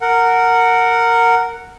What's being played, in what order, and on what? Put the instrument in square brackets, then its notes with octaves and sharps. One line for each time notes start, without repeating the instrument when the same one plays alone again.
[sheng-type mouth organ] A#4 F#5